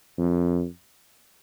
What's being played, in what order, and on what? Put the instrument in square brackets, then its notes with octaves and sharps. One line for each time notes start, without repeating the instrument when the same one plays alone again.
[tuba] F2